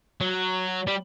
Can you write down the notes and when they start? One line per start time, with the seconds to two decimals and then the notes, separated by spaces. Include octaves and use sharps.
0.21 F#3
0.87 G3